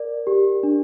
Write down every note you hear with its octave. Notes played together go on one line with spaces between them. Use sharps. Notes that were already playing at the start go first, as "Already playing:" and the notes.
Already playing: A#4 D5
G4
D4